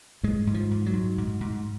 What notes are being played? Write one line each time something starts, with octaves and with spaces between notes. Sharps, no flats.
G#2 G#3
G#2
F3
G#2
F#3
G#2
G#2
G#2